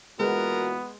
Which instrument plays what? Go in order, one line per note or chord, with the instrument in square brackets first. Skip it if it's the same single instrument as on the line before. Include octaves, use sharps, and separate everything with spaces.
[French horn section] A#2 E3 F#4 [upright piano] G#3 B4 [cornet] B3 [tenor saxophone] A#4